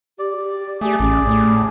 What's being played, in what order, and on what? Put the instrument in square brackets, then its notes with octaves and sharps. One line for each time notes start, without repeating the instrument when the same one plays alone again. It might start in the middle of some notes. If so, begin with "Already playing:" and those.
[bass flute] G4 [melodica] D5
[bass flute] G4
[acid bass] A3 [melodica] G#4 D5
[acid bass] A1 [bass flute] C#4
[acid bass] A2 [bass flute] A3